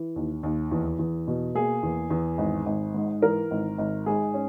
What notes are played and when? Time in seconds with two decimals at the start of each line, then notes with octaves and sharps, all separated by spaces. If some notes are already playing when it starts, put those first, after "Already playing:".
Already playing: E3
0.16 D#2
0.43 D#2
0.71 E2
0.99 E2
1.27 B2
1.55 A#3 G#4
1.83 E2
2.10 E2
2.38 G#1
2.66 G#1
2.94 G#2
3.22 E3 A#4
3.51 G#1
3.78 G#1
4.06 G#2 G#4
4.34 C#4